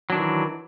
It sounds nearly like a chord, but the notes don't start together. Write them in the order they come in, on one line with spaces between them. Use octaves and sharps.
F#3 D4 D#3 E3